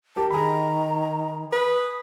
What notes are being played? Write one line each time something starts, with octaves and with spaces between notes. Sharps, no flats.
G4 A#4 A5
D#3 G#4 A#5 B5
B4 D#6